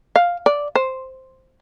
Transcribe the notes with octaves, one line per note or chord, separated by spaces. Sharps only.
F5
D5
C5